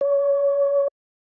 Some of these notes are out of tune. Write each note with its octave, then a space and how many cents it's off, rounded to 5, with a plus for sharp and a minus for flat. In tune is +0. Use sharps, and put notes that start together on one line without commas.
C#5 +25